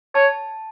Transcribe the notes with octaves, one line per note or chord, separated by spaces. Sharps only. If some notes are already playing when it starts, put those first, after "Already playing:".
C#5 A5